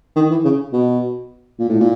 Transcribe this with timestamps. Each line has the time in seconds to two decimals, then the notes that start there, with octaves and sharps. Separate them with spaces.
0.16 D#3
0.31 E3
0.45 C#3
0.73 B2
1.59 A#2
1.70 A2
1.80 A#2